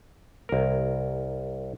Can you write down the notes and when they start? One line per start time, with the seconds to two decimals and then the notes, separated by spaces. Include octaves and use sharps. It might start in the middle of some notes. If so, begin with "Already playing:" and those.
0.49 C2 A#4